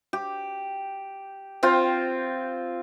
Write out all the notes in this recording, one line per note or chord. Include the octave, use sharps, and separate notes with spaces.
G4
C4 F4 G5